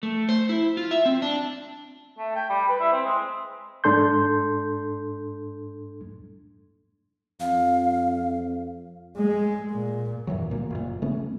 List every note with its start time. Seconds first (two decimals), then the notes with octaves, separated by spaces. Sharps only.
0.03 A3
0.29 C5
0.49 E4
0.77 F4
0.91 E5
1.06 C4
1.22 D4
2.18 A3
2.35 G5
2.50 G3
2.68 B4
2.80 E4
2.93 C4
3.05 G#3
3.84 G#2 D4 A4 C6 G6
7.40 F2 F5
9.17 G#3
9.71 A#2
10.27 F#2 A#2 E3 F#3
10.50 D2 A#2 A#3
10.70 F#1 A#2
11.02 C#3 A3 B3 C#4